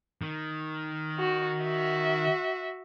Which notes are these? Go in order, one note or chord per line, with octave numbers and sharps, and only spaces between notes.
D#3
F#4
F#4 E5